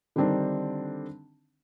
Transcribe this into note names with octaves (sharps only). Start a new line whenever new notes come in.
D3 D#3 G3 C4 D4 D#4